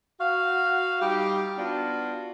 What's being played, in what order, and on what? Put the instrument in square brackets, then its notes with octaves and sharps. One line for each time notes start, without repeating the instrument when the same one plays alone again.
[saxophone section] F#4 F5
G3 D#4 G4
B3 D4 F4 F#4